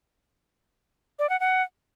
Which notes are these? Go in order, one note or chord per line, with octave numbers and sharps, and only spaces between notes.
D5
F#5
F#5